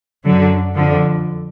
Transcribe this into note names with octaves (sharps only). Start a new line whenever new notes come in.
F#2 D3 F#3
F2 D3 F3